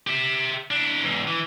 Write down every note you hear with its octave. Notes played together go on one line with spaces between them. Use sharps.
G4 E5
D4 E4
E2 G#2
E3